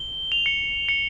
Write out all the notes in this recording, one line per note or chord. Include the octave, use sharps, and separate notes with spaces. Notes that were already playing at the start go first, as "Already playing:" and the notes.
Already playing: G7
F7
C#7
C#7